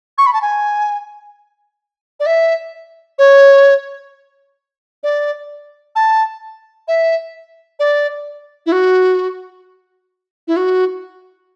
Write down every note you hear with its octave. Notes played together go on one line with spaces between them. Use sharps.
C#6
B5
A5
G#5
D5
E5
C#5
D5
A5
E5
D5
E4
F#4
E4
F#4